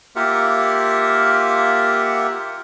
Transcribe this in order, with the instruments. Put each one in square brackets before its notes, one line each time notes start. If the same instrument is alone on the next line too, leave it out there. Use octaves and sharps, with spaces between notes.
[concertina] A#3 F4 G4 A#4 E5 F#5